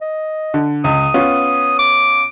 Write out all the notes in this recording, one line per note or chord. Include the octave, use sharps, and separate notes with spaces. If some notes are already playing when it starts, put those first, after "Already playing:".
D#5
D3
C#2 D#6
B3 C#4 F4
D6